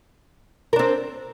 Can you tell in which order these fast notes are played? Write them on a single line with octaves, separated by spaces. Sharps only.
A#4 D4 C4